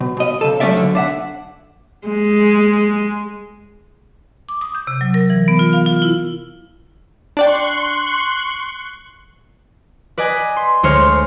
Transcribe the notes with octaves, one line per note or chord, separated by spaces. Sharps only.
B2
B2 D#5
C#3 A4
F#3 A3 C#4 A4 D5 E5
B1 D3
D4 E5 F#5
G#3
D6
D#6
G6
C3
F#3
A#4
E3
B3
F4
F5
F4
E4
D4 D5 G5 C6 C#6 F#6
B4 D5 D#5 G#5
C6
D2 G#3 C5 C#5 C6 F6